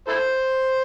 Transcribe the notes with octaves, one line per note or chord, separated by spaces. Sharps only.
E4 A4 C5